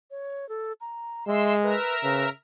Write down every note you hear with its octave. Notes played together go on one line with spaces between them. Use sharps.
C#5
A4
A#5
G#3 E5 C6 E6
A#4 B4 E5 A#5
C#3 B4